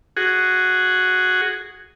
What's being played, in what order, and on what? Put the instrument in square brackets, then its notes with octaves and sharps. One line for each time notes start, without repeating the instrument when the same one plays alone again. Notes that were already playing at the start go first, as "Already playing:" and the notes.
[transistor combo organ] F#4 G#4